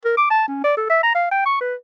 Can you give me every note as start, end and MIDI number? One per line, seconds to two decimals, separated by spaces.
0.05 0.13 70
0.17 0.26 86
0.30 0.46 81
0.48 0.59 61
0.64 0.75 74
0.77 0.87 69
0.89 0.98 76
1.03 1.14 82
1.15 1.28 77
1.31 1.44 79
1.45 1.60 85
1.60 1.74 71